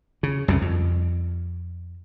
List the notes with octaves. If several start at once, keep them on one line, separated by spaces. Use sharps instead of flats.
C#3
C2 F#2 C#3
F2